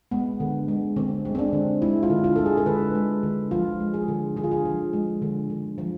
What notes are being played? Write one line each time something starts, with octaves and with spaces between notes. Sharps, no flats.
G#3 B3
D3
G#3
D3 C4
G#3
C4
D4
D3
G#3 E4
F4
D3
F4
G#3 A4
G#4
A4
D3 B4
G#3
D3
F3 F4
G#3
G#4
D3
D3 G#4
F4
G#4
F3
G#3
D3
D3
F3